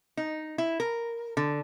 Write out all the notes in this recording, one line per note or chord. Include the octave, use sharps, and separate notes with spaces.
D#4
E4
A#4
D3